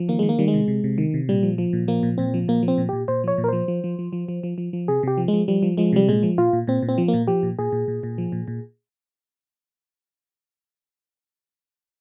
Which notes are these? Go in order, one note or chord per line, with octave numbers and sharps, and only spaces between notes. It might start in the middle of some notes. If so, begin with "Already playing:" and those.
Already playing: F3
D#3 A#3
D#3 G#3
A#3
D#3 G3
G#3
C3
C3
C3
D#3
C3
A#2 G3
F3
F3
A#2
F3 A#3
A#2
A#2 C4
F3
A#2 A#3
F3
C4
A#2
A#2 G4
A#2 C5
F3 C#5
A#2
A#4
F3 C5
F3
F3
F3
F3
F3
F3
F3
F3
C3 G#4
C3 G4
F3
G#3
F3
F3 G3
F3
F3 G#3
C3 G3
A#2 G#3
F3
A#2 F4
A#2
A#2 C4
A#2
C4
F3
A#3
A#2
F3 G4
A#2
A#2 G#4
A#2
A#2
A#2
F3
A#2
A#2